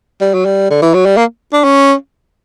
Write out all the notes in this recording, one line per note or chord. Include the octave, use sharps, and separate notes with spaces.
G3
F#3
G3
D3
E3
F#3
G3
A#3
D4
C#4